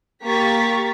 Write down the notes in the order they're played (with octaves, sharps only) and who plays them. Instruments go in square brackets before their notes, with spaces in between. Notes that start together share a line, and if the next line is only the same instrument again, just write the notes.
[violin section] A#3 G4 A#5 C#6 A6 B6